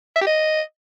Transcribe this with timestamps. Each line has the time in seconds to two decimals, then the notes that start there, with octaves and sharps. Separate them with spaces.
0.16 E5
0.21 G4
0.27 D#5